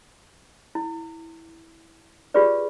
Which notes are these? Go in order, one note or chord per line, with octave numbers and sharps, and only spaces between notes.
E4
F4 G4 G#4 B4 D5